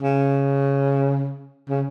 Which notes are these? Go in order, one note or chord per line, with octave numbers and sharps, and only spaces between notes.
C#3
C#3